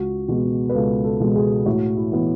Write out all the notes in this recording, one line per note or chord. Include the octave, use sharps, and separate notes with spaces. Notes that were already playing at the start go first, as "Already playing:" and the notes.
Already playing: C#2 F#4
B2 G#3 B3 F#4
B4
C#2 A4
A4
B2 G#3 B3
G#4
A2 F#4
E4
E3 B3